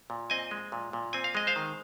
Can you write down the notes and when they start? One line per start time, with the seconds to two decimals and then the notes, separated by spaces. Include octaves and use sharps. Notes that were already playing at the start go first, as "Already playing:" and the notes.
0.10 A#2
0.30 C4 D#5 G#5
0.51 G#3
0.72 A#2
0.93 A#2
1.13 C4 G#5
1.24 F5
1.35 G#3 D#5
1.47 C5 F5
1.56 D#3